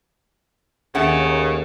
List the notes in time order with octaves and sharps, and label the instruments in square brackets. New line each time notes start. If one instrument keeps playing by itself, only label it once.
[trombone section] D#2 [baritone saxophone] C#3 [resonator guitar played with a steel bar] A3 C#4 F#5